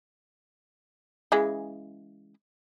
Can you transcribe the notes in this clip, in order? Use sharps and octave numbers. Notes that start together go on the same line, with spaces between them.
C#3 E3 G#3